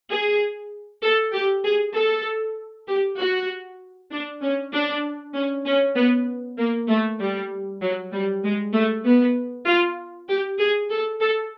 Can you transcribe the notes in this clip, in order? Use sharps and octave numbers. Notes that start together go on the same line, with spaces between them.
G#4
A4
G4
G#4
A4
G4
F#4
D4
C#4
D4
C#4
C#4
B3
A#3
A3
G3
F#3
G3
G#3
A3
B3
F4
G4
G#4
A4
A4